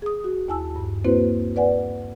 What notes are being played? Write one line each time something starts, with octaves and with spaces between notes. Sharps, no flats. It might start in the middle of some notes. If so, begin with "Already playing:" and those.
G#4 D#6
F#4
D#2 E4 G#5 A5 E6
G2
A#3 C4 E4 F#4 B4 C5
B4 D5 F#5 G#5